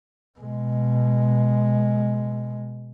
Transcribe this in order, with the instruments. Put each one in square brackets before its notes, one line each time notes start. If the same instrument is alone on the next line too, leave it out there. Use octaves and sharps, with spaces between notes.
[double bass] B2 G#3